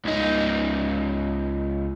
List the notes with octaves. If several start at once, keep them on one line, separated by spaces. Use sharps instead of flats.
C#2 D#4